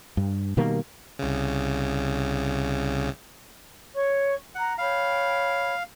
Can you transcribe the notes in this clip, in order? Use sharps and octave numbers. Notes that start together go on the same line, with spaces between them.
G2
B2 D#3 G3 A#3
C2 C#3
C#5 C#6
F#5 A#5
C#5 F5 G5 B5